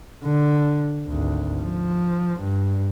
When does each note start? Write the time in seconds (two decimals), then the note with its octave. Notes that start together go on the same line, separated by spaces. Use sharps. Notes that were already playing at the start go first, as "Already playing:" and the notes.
0.24 D3
1.08 G#1 D2
1.62 F3
2.41 G2